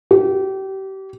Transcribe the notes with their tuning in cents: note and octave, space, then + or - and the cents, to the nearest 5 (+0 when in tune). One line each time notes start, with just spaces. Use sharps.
G4 -30